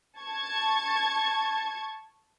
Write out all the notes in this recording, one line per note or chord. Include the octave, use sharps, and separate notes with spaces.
A5 C#6 G#6